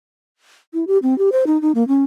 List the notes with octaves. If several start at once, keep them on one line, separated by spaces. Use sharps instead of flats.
E4
G4
C4
G4
C5
D#4
D#4
A#3
C#4